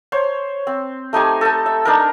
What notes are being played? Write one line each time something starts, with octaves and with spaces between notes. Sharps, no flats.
C5 C#5
C4
A3 D#4 G4 G#5
A4 A5
E5
D4 D#4 A#4